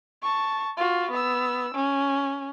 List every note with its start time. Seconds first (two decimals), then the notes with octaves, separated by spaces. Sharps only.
0.22 A5 C#6
0.77 F4 F#4
1.11 B3 E6
1.74 C#4